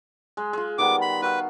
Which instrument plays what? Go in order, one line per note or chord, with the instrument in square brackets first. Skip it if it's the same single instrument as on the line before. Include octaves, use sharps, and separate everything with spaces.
[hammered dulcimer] G#3
G#3 F4
[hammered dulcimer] D#3 G3 B3 [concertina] D6
[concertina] B5
[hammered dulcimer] F#4 F5 [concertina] B4